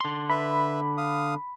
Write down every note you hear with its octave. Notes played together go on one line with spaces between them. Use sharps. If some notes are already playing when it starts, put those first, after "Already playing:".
D3 C6
B4 E5 B5
F5 D#6